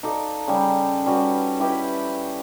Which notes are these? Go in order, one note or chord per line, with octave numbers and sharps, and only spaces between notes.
D#4 A4 D5 F5
C#3 G3
G3 C#4 F#4 B4
E4 G4 B4 D#5